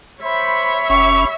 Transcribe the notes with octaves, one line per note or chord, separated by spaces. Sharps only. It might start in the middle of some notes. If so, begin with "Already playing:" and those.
C5 C#5 E5 B5
F#1 C#4 G4 B5 C#6